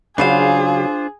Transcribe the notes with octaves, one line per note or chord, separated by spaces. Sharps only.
C#3 F#3 D4 F4 G#4 C5 F5